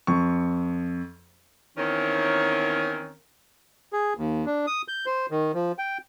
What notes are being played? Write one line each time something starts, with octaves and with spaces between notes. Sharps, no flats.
F2 C#6
E2 D#3 C4 C#4 A#4 C#5
G#4
D#2
D4
D#6
G6
C5
D#3
F3
G5